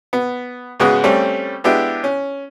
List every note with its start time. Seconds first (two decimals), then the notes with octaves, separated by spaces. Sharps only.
0.13 B3
0.80 G#2 C#3 G#3 B3 F#4 D#6
1.04 G3 A3 C4 C#4
1.64 G#3 B3 D4 E4 G4
2.04 C#4